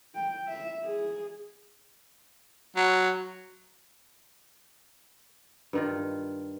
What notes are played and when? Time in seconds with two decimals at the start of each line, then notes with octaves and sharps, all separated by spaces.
0.15 G5
0.48 E5
0.84 G#4
2.76 F#3
5.73 G2 D#3 F4